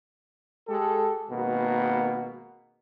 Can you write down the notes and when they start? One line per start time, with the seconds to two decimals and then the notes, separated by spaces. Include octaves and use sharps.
0.68 G#3 G4 A4
1.29 G#1 B2 A#3